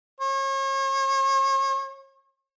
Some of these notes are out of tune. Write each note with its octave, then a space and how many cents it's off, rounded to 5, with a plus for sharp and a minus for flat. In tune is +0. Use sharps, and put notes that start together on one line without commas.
C#5 -40